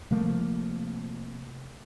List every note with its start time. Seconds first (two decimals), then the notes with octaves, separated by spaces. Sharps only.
0.11 C3 F3 A3 A#3